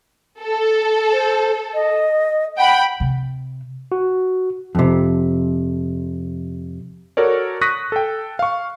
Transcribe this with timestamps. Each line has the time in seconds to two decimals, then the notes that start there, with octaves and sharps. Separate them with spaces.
0.40 A4
1.12 C5
1.74 D#5
2.58 F#5 G5 B5
3.00 C3
3.92 F#4
4.75 F2 C3
7.17 F#4 A4 A#4 C#5 D5
7.61 C#6 D#6 F#6 A#6 B6 D#7
7.92 A4 G5
8.39 F5 C#6